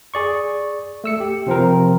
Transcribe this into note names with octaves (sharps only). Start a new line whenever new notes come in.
G#4 D5 C#6
A3 E6 C#7
G4
C3 F3 C4 A#4